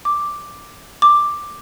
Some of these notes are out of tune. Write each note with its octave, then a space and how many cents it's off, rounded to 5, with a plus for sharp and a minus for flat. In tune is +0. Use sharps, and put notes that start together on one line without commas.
D6 +0
D6 +5